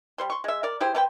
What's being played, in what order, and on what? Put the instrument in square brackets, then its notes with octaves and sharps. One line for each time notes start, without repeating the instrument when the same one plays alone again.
[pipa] G3 C5 C6
C6 C#6
G#3 E5
A#4 D5
E4 G4 G#4 C5
A3 B4 C5 G5